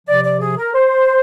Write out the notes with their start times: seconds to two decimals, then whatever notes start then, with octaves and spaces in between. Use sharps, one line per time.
0.07 C3 F3 D5
0.24 D5
0.41 G#4
0.57 A#4
0.74 C5